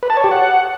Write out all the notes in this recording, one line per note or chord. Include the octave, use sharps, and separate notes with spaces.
B4
A5
C#5
G4
F#5